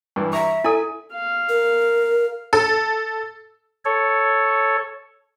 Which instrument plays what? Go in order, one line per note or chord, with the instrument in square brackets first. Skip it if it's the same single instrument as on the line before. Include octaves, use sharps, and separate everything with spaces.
[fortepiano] G2 E3
[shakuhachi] E5 [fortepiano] A#5 C#6
[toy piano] E4 A4 [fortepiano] G#5
[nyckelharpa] F5
[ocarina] A#4
[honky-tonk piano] A4
[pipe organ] A4 C#5